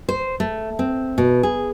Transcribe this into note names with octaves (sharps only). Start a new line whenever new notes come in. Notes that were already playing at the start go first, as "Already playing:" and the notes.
C5
A3
C4
B2
G#4